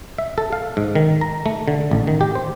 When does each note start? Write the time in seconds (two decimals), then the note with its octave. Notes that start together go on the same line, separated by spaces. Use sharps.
0.18 E5
0.38 A4
0.53 F5
0.77 G#2
0.95 D#3
1.21 A#5
1.46 A3
1.68 D3
1.91 A1
2.07 D#3
2.21 G4
2.35 C5